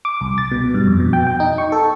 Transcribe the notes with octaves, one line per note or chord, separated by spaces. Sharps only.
D6
C2
A6
B2
G2
F2
B2
G5
G5
D#4
C#6
A4